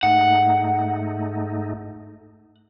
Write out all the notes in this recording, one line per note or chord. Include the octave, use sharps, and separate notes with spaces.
G#2 A3 D#4 F#5